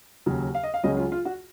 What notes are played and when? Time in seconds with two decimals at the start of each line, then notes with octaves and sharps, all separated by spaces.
0.26 D#2 C#3 F#3
0.55 F5
0.63 D#5
0.74 F5
0.83 C#2 C#3 F#3 C#4 D#5
0.97 F4
1.12 F4
1.25 F#4